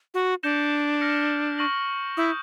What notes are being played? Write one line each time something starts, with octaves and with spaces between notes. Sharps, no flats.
F#4
D4 G6 A#6 C#7 E7 G7
F6 A#6 C#7
C#6 F6 A#6 D7 F#7
E4 D#6 G6 A#6